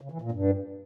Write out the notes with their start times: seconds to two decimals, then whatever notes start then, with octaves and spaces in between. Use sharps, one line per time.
0.01 C#3
0.11 E3
0.22 A#2
0.32 G2